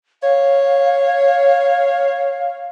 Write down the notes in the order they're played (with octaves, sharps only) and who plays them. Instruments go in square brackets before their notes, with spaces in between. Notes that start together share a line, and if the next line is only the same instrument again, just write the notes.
[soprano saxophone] C#5 [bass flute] F5